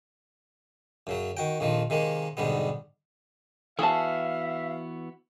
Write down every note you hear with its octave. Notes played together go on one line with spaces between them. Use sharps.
F#2 C#3 F#3
D#3 F#4 G5
A#1 F2 D#3 F3
C3 D#3 G#3 A#3
B1 G#2 D3 G3 B3
E3 B3 F#4 G#4 E5 F5 A5